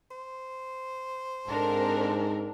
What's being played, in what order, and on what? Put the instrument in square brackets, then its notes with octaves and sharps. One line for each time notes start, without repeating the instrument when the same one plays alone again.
[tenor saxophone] C5
[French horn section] G#2 [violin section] C4 A4 A#4 [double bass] D4